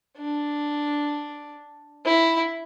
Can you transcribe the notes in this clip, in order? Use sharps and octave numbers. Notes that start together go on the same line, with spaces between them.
D4
E4